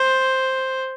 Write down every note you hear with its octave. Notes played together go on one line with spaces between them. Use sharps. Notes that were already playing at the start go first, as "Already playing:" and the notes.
Already playing: C5